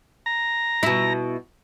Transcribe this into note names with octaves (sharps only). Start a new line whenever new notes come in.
A#5
B2 E4